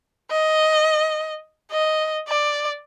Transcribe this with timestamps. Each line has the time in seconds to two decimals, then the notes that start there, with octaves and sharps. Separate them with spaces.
0.31 D#5
1.72 D#5
2.28 D5